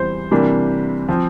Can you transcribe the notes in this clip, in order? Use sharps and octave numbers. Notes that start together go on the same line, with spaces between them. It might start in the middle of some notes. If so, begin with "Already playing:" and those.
Already playing: E2 E3 G3 C4 C5
C3 E3 G3 A#3 D4
F3 C4